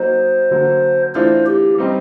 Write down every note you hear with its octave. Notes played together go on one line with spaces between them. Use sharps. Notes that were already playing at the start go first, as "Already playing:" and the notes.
Already playing: F#3 A#3 D#4 C5
D3 F#3 A#3
E3 A3 D4 F4 C5
G4
G3 C4 D#4